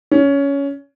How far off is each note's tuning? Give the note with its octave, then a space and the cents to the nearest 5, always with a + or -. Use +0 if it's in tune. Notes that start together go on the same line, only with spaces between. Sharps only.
C#4 +15